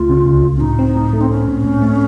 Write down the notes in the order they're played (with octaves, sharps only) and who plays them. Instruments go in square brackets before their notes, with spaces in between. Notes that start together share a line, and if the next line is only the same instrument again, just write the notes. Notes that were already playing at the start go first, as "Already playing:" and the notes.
Already playing: [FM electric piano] C#2 A3 [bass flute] F4
[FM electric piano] C#3
C#2
C#2
[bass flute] C#4
[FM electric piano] A2 [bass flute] D#4
[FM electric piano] C4
A2
A3
[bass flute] C4
[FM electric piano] A2 [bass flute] C#4
[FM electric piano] A2
A2
A3